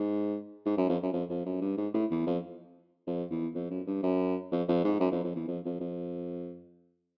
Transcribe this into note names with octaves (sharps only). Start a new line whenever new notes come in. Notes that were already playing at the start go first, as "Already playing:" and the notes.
Already playing: G#2
G#2
F#2
F2
F#2
F2
F2
F#2
G2
G#2
A2
E2
F2
F2
E2
F2
F#2
G2
F#2
F2
F2
G#2
F#2
F2
F2
E2
F2
F2
F2